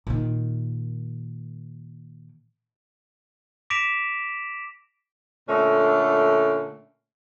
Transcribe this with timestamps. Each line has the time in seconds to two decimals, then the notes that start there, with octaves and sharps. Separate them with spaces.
0.07 A#2 D#3
3.70 D6 A#6 B6 D7 E7 F7
5.48 A#2 D3 A3 C#4